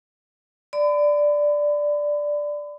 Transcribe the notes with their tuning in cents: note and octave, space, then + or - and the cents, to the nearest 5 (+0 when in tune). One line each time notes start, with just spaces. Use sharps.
D5 +0 B5 +35